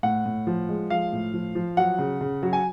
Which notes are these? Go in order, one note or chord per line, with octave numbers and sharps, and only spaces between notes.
A2 F#5
A2
F3
G#3
F3 F5
A2
F3
F3
F#3 F#5
C#3
C#3
F#3
G#5